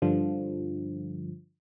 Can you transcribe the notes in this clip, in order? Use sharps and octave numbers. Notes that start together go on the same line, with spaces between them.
G2 D3 F3